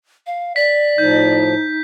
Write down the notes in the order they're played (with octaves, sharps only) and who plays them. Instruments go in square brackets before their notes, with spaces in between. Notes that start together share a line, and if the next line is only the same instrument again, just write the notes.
[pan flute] F5
[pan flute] D5 [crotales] B6
[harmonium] A2 F3 [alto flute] D#4 [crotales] G6